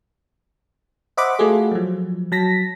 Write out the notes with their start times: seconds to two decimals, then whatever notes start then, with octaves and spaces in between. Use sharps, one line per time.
1.17 C5 D#5 E5 F#5 B5 D6
1.39 A3 F4 F#4 G#4 A4
1.71 F3 F#3
2.32 F#3 A5 A#6 B6